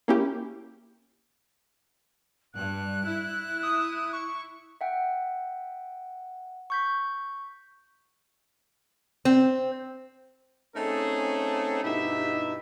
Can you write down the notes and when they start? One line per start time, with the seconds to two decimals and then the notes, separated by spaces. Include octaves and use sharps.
0.08 A#3 C#4 E4 G4
2.54 G2 F#6
3.06 E4
3.63 D#6
4.13 C#6
4.81 E5 F#5 G5
6.70 C#6 G6 B6
9.25 C4
10.76 A3 C4 C#4 D#4 G#4 A4
11.83 G2 B2 D#4 E4 G4 E5